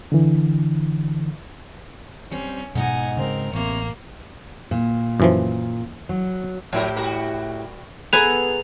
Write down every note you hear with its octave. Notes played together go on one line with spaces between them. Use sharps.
D3 E3
G3 C4 C#4
G#2 B2 D#4 D#5 F#5 G#5
C#3 G#3 C4 A#4
A1 C3 A#3 C#5
A#2
F#2 E3 F3
F#3
A2 F3 E4 G4 A#4
G3 F#4 A#4
B3 G#4 A4 B4 G#5 A#5 F7